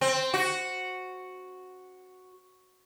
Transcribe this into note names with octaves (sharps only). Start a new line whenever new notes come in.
C4
F#4